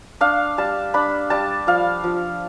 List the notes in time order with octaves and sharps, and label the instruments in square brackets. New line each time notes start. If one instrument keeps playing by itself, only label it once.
[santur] D4 F5
G3 A5
D4 B5
G3 A5
F3 F5
F3